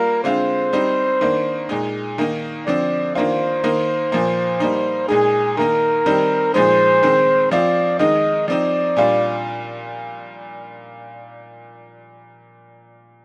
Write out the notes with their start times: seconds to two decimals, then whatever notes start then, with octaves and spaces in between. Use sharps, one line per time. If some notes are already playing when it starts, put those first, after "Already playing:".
Already playing: G3 A#3 F4 A#4
0.24 D3 G#3 C4 F4 C5
0.73 G3 C4 D#4
1.21 D#3 A#3 D4
1.69 A#2 G#3 D#4
2.18 D#3 A#3 D#4
2.66 D3 F3 C4 D5
3.15 D#3 A#3 D4 F4 C5
3.64 D#3 A#3 D#4
4.12 A#2 F3 A#3
4.60 G3 A#3 D#4
5.08 A#2 G#3 D#4 G#4
5.57 D#3 A#3 D#4 A#4
6.06 D#3 G3 C4 D#4
6.54 A#2 F3 G#3 D#4 C5
7.03 D#3 G#3 C4
7.51 F3 C4 F4 D5
7.99 D#3 G#3 D#4 D#5
8.48 F3 C4 D#4 D5
8.97 A#2 G3 D4 F4